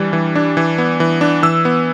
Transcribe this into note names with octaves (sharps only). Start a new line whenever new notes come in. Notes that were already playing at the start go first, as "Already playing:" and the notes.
Already playing: E3 G3 D4
E3
D4
E3
B3
E3
D4
E3 E6
B3